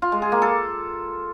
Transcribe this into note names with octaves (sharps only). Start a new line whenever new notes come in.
F4
G#3
G#4
A#3
A4